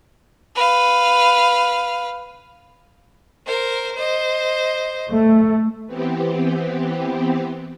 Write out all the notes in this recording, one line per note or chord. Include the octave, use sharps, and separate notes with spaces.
B4 F5
A#4 C5
C5 D#5
A3
E3 B3 C4 G4